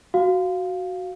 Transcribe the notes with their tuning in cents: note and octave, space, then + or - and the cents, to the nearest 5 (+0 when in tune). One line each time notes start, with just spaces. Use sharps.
F#4 +0 F5 +0